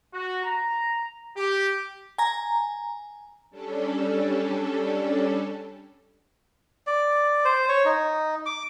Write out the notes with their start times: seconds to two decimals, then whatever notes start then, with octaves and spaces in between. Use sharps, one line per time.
0.13 F#4
0.43 A#5
1.37 G4
2.18 G#5 A#5
3.50 G3 C#4 D4 A4
6.87 D5
7.45 C5
7.69 C#5
7.85 D#4
8.46 D6